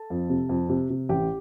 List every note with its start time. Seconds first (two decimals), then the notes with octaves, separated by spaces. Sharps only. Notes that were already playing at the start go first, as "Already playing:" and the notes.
Already playing: A4 A5
0.10 F2
0.30 C3
0.49 F2
0.69 C3
0.90 C3
1.09 A1 G4 G5